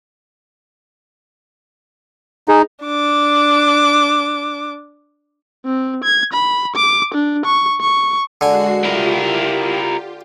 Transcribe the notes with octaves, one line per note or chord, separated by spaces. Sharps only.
D#4 G#4
D4 D6
C4
G#6
B5
D6
D4
C#6
C#6
D3 G#3 F#4 G#5 C7
E4 F4 G4 A#4